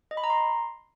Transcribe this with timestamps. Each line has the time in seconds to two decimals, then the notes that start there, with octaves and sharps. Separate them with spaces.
0.11 D#5
0.17 B5
0.24 A#5
0.30 C6